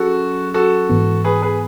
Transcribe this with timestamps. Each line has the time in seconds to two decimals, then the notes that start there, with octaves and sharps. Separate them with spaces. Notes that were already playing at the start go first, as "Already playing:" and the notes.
Already playing: F#3 C#4 F#4 G#4 A4
0.54 F#4 A4
0.89 G#2 E3 B3
1.24 G#4 B4
1.42 G#4 B4